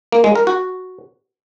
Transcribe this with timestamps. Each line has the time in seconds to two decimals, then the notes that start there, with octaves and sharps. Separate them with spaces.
0.12 A#3
0.24 G#3
0.35 A#4
0.47 F#4